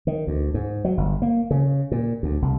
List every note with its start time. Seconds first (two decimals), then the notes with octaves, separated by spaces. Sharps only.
0.07 D#3
0.27 D2
0.54 G#2
0.85 F#3
0.97 G1
1.22 A#3
1.51 C#3
1.92 A#2
2.23 D2
2.42 C2